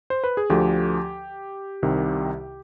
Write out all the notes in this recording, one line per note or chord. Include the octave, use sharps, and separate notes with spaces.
C5
B4
G#4
D2 D3 F3 G4
C2 C3 D#3